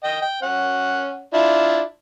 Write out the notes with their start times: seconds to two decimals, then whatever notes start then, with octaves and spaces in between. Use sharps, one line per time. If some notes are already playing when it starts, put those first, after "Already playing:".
0.04 D#5 G5
0.22 G5
0.42 C#4 F#5
1.34 D4 E4 F4